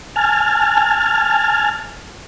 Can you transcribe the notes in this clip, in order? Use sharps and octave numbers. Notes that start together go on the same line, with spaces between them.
G#5 A5 F6